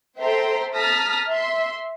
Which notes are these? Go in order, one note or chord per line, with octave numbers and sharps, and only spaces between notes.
A4 C5 E5 G5 A#5 C6
A5 A#5 D#6 F6 A#6 B6
E5 C6